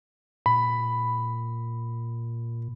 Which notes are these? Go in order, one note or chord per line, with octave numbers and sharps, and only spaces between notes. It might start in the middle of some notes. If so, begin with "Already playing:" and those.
A#2 B5